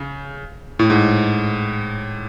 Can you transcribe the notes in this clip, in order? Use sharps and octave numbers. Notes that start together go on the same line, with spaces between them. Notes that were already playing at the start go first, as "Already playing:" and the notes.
Already playing: C#3
A2
G#2